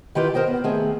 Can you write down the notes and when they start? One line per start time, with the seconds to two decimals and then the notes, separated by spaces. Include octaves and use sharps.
0.15 D#3 E4 F4 G4 B4
0.34 A#4 C5 D#5 G5
0.47 B3
0.64 D#3 A3 B3 C4 G#4